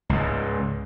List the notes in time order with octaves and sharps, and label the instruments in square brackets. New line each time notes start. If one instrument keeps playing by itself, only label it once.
[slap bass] C#2 G#2